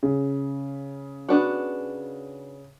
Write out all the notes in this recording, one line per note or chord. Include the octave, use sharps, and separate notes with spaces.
C#3
B3 D4 F#4